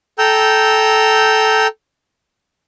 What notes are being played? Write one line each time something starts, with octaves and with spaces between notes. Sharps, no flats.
A4 G5 A#5 E6 G6